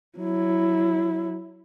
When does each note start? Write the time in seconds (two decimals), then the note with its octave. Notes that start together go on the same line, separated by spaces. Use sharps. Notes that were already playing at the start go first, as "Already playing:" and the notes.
0.19 F#3 E4